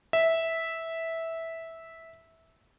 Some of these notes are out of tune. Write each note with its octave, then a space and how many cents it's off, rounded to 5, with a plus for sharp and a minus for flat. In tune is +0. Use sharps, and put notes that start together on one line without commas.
E5 -10